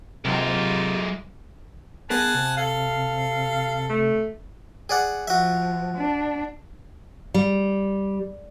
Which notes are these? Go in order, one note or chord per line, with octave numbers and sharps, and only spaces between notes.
C3 F#3 G#3 A#3 D#4 F4
B3 G#4 A#4 F#5 G#5 A5
C3
A4 F5
A3
G#4 D5 F#5
F3 F#4 E5
D4
G3